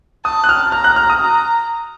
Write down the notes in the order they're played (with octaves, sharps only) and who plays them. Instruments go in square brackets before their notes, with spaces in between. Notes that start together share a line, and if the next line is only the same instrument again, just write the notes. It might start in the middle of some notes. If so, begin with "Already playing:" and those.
[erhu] A5 [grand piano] D#6
[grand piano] F#6
F6
[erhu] A#5 [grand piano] F6
[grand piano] F#6
F6
D#6
[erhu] A#5